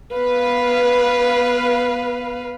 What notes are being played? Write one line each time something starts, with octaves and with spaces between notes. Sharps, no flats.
B3 B4 F5